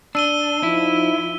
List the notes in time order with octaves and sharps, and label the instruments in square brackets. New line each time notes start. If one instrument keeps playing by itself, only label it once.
[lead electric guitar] D4 [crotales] E6 D#7 G7
[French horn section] F3 D#4 [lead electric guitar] E4